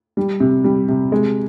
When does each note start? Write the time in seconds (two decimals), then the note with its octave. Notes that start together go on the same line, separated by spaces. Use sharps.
0.17 G3
0.40 C3
0.64 G3
0.88 C3
1.12 G#3